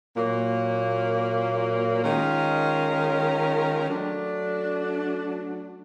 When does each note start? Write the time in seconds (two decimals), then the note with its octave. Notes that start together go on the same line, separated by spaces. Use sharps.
0.16 A#2 F#3 A#3
2.03 D#3 G#3 C#4 F4 A#4
3.90 F#3 A3 D4